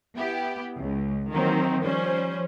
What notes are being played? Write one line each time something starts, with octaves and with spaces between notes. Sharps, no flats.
B3 E4 G4
C#2
D#3 E3 F#3 A#3 C4
F3 G3 C#4 C5